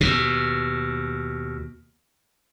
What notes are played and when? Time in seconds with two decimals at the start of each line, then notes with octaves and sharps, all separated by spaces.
0.01 D#2 B2